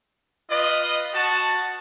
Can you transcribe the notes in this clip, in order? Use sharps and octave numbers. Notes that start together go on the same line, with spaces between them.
F4 B4 D#5
F#4 A5